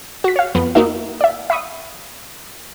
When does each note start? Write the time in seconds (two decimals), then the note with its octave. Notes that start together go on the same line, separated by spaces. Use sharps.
0.24 F#4 B6
0.36 C#5 F5
0.55 F2 B3
0.75 A#3 D#4 F#4 E5
1.21 D5 E5
1.50 E5 B5 C#6 D#6